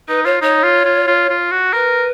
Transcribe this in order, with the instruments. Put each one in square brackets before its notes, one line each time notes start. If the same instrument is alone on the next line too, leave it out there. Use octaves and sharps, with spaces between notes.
[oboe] D#4 [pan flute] B4
[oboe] F4 [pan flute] C#5
[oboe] D#4 [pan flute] C#5
[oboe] F4
F4
F4
F4
F#4
[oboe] A#4 [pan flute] B4